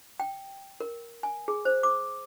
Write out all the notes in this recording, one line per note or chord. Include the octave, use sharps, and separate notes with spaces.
G5
A#4
G#5
G#4
C5
D6